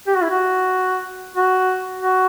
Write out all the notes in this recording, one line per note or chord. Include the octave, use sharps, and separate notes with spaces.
G4
F#4
E4
F#4
F#4
F#4